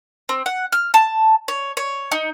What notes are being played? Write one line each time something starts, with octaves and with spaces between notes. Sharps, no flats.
C4
F#5
F6
A5
C#5
C#5
D#4